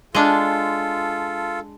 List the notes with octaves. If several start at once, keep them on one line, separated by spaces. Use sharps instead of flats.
G#3 D4 F4 A4